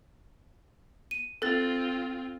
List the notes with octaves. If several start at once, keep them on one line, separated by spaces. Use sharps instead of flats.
D#7
C4 F4 A4 F#6 A6